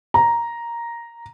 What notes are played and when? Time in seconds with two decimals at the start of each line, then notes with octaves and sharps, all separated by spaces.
0.14 A#5